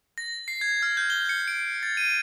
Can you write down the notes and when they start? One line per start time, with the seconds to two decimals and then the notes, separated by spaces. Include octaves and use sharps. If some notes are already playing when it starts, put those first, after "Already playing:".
0.18 A#6
0.48 C7
0.61 G#6
0.83 F6
0.97 G6
1.10 G7
1.29 C#7
1.48 D7
1.83 A6
1.97 D#7